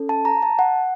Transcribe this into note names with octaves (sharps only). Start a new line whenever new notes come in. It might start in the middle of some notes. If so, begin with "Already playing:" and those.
Already playing: C#4 A4
A5
A#5
A5
F#5